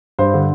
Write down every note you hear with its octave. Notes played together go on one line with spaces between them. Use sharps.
G2 C5
D3